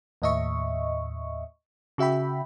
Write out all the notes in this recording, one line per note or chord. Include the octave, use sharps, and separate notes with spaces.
D#2 A2 D#5 E5 C#6
C#3 F#4 E5 G5 B5